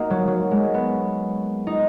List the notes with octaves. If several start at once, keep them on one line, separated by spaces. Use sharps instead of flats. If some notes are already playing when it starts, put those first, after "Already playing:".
Already playing: A#3 D#4 F#4
F#3
F#3
G#3
B3
D#4